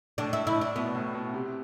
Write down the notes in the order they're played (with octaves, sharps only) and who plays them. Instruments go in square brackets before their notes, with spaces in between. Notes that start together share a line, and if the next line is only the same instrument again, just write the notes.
[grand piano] A2 [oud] D4
[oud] E4
[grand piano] A2 [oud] E4
[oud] D4
[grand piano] B2 [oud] B3
[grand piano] A2
B2
C3